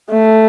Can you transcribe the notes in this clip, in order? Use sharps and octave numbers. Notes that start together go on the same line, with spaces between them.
A3